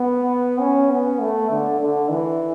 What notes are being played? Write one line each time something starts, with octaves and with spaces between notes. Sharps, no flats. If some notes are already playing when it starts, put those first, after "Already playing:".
Already playing: B3
C#4
B3
A3
D3
D3
E3